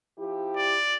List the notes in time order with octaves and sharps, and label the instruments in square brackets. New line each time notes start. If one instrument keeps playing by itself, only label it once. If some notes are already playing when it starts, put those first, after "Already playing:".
[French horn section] F3 E4 G4
[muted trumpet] D5